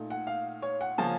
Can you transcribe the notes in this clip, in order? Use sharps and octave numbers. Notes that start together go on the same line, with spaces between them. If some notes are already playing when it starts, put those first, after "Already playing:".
Already playing: A#2 A3 D#4
F#5
F5
C#5
F#5
C#3 F3 A#3 C#4 A5